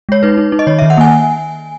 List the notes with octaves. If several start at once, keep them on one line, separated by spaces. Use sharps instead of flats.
G#3 C#5
D#4 B4
D#4
D#4
D#5
D#3 C#5
E5
D#3
F#5
A#3 G#5